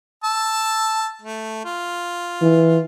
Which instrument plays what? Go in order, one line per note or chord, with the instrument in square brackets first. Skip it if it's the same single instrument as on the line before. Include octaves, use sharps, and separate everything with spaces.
[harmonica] A5 E6
A3
F4
[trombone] E3